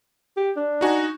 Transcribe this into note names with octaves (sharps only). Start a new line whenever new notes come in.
G4
D4
D#4 F#4 G#5